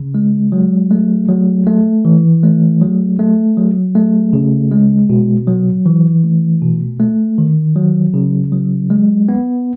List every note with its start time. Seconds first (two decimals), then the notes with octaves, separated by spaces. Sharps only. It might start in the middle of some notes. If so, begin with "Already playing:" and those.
Already playing: C#3
0.15 G#3
0.52 F#3
0.91 A3
1.29 F#3
1.67 A3
2.05 E3
2.43 A3
2.81 F#3
3.19 A3
3.57 F#3
3.95 A3
4.33 C#3
4.71 G#3
5.10 B2
5.47 F#3
5.86 E3
6.24 A3
6.62 B2
7.00 A3
7.38 D#3
7.76 F#3
8.14 C#3
8.52 F#3
8.90 G#3
9.29 B3